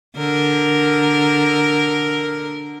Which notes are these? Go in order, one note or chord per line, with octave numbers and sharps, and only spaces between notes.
D3 A#4